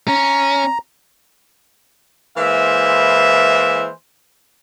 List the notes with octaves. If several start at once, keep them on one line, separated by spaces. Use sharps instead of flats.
C#4 A#5
E3 G#3 A#3 E4 C5 E5